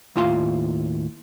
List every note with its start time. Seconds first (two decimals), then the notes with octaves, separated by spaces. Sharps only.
0.16 D#2 A2 F4 F5 G5 C6